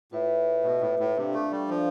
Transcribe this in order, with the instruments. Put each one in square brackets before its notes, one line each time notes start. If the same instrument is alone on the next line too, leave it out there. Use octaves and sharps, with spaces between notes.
[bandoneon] A2 [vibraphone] F4 B4 E5
[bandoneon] B2 [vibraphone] F4 B4 E5
[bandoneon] A2
A2
[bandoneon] C3 [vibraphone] D4 F4 A4 D5 F5
[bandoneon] A3
G3
[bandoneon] F3 [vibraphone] D4 F4 A4 D5 F5